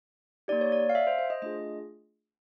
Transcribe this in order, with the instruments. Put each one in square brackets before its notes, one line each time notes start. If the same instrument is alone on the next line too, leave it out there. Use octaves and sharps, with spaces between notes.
[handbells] A#3 D#4 G4 D5
C#5
D5
F5
E5
C5
C5
D#5
A3 D4 F4 G#4 D#5